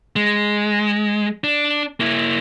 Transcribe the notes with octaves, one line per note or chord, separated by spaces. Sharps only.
G#3
D4
A#3 E4